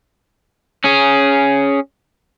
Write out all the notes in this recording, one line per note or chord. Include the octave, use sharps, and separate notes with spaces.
C#4 G#4